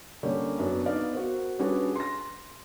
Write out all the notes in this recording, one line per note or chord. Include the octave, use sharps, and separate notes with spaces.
D3 G3 A#3 C#4 G4 C#5
F#2 F#3 B3 D4
B3 D#4 D5 F5
F#4 A#4 C5
G3 C#4 D4 F#4 G#4 B4
C6 A#6